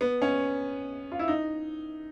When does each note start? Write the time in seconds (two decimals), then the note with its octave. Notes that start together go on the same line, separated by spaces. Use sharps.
0.01 B3
0.22 C#4
1.12 F4
1.19 E4
1.28 D#4